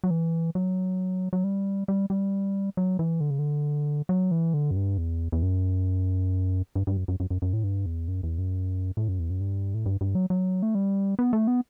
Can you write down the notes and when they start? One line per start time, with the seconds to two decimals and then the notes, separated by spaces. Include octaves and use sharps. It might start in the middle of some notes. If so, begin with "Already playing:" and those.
0.04 F#3
0.10 E3
0.55 F#3
1.33 F#3
1.44 G3
1.88 G3
2.10 G3
2.77 F#3
2.99 E3
3.20 D3
3.30 C#3
3.39 D3
4.09 F#3
4.31 E3
4.54 D3
4.71 F#2
4.76 G2
4.98 E2
5.32 E2
5.43 F#2
6.75 G2
6.87 G2
6.97 F#2
7.08 F#2
7.20 F#2
7.30 F#2
7.42 F#2
7.53 A2
7.64 G2
7.86 E2
8.08 F#2
8.23 E2
8.38 F#2
8.97 A2
9.08 F#2
9.19 E2
9.30 F#2
9.41 G2
9.74 A2
9.86 G2
10.01 G2
10.15 F#3
10.30 F#3
10.63 A3
10.75 G3
11.19 B3
11.33 A3
11.47 B3